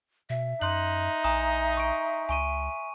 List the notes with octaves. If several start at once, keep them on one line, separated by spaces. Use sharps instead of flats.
B2 E5
F#2 D#4 C6 F#6 F#7
A#1 G#5 A#5 D#6
C#6 D7
C#2 G#5 C#6 D#7